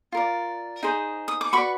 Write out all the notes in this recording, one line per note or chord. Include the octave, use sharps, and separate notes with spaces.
F4 A#4 D5
D#4 G#4 C5
D#6
D6
F#4 B4 D5 B5 C#6